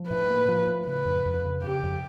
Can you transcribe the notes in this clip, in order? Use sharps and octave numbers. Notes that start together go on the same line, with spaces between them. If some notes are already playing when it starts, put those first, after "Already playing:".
Already playing: F3
A2 B4
A#3
F3
A2
C#3 B4
F2
F2
C#3
C#3 G4
F2